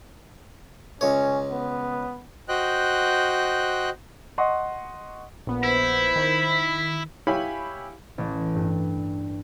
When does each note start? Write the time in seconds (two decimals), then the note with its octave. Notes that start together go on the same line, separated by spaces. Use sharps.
1.01 C#2 C#4 C#5
1.51 B3
2.48 F#4 C5 D#5 G5 F#6
4.38 D#5 F#5 C6 C#6
5.47 A#1 B3
5.63 E4 C5 B5
6.16 D#3
7.27 E4 G4 C#5 F5 G#5 B5
8.18 A1
8.55 G2